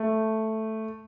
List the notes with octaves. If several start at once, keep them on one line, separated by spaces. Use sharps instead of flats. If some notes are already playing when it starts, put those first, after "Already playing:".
Already playing: A3